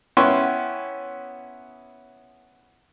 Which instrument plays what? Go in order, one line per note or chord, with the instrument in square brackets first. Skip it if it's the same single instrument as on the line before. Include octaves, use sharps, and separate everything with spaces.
[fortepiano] B3 C#4 E4 G5 C6 C#6